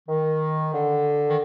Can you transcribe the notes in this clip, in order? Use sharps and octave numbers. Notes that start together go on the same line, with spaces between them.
D#3
D3
D#3